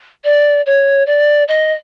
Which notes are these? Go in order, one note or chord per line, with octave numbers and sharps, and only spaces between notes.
D5
C#5
D5
D#5